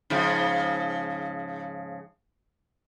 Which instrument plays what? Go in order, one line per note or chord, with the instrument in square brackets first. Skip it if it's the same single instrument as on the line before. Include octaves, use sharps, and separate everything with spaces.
[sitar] G#2 C#3 F3